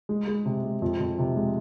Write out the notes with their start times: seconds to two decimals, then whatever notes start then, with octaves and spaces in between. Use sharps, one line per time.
0.09 G#3
0.27 G#3
0.46 C3
0.64 G#3
0.82 F2
1.00 F2
1.19 C3
1.36 G#3